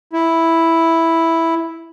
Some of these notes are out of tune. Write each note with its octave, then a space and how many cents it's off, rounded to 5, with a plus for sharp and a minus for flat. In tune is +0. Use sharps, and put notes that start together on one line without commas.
E4 -5